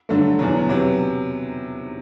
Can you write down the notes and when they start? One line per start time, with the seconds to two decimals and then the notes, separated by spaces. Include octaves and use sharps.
0.09 G2 D3 F#3 A3
0.39 E2 B2 F#3
0.69 C3 F#3 B3